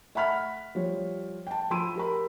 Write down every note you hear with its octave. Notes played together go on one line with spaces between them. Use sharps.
E5 F#5 B5 F6 B6
F3 G3 C#5
G5 A5
F3 B5 C6 E6 D7 D#7
G4 A#4 B5